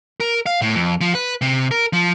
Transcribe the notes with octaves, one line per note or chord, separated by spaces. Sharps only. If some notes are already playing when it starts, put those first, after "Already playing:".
A#4
F5
A2
F2
F3
B4
C3
A#4
F3